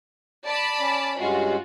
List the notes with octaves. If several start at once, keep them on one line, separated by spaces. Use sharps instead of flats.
D5 A5 B5
C#4
G2 G#3 C#4 F4 F#4